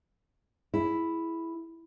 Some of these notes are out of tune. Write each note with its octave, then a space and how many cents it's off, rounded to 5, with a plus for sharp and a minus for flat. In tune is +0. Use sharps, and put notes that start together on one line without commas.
E4 +0 G#4 +5